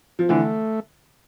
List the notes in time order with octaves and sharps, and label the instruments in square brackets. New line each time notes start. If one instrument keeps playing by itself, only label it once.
[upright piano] F3
[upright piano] D3 E3 [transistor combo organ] A3